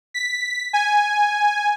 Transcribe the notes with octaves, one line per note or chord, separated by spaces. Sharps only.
B6
G#5